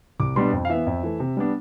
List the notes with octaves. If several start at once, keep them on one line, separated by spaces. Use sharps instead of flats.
C2 D6
B2 G3 B3 D4 C6
F2
F5
E3 B3 E5
F2
E3 A3
C3
G3 B3 D4